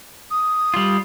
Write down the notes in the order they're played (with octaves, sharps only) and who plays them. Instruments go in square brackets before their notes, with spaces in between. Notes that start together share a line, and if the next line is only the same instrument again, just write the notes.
[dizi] D#6
[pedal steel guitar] G3 F4